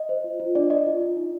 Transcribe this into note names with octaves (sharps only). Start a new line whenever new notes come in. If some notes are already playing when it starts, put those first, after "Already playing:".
Already playing: D#5
C5
F4
F4
D4 D5
D5 D#5
F4
F4
D#4